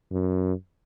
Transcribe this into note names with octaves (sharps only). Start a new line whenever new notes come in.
F#2